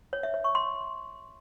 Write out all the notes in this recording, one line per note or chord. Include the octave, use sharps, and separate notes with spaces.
C#5
E5
C#5
C#6
C6